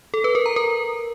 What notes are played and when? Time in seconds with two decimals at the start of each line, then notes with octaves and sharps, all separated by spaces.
0.14 A4
0.24 B4
0.35 A#4
0.46 A#5
0.56 A#4